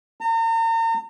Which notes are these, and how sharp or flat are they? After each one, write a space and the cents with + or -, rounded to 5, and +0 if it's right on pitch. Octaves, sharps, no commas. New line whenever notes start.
A#5 -40